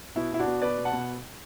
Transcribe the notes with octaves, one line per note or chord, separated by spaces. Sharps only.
B2 E4
B2 E4
D4 F#4
B2
B2 B4 D5
B2
F#5 A5
B2